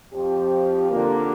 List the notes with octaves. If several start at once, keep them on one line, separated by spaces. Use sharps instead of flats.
F2 F3 C4 G4
D3 A#3 F4